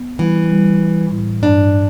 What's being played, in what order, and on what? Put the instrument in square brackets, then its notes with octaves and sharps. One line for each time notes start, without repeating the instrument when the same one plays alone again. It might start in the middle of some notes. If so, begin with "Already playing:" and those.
Already playing: [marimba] B3
[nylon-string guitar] E3 [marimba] G3
[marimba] G3
G3
A2
[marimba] G2 [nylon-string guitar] D4